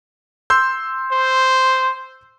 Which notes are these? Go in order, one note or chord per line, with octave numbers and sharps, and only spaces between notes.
C6 E6 G6
C5